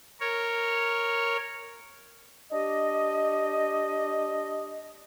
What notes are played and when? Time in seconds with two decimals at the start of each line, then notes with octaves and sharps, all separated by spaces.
0.20 A#4 C#5
2.52 D4 G4 D#5